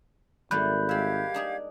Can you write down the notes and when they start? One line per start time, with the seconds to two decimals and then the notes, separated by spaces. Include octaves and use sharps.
0.51 G#1 G3 A3 A#3 B5 F#6 G6
0.89 G#3 G4 E5 F5 G#6
1.34 D4 D#4 G#4